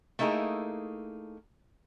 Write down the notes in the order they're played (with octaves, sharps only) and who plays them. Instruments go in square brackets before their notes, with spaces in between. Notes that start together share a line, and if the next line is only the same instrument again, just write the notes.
[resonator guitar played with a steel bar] A3 A#3 D#4 E4 G#4